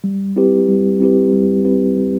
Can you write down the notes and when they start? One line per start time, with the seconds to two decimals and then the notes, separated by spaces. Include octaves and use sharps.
0.04 G3
0.36 C4 E4 G4 B4
0.68 G3
1.00 C4 E4 G4 B4
1.33 G3
1.65 C4 E4 G4 B4
1.96 G3